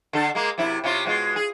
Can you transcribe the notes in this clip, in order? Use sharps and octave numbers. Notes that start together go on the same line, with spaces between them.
D3 A4
G#3 A#3
F#2 C3 E4
C3 C#4 F4
B2 G#3 F4
G#4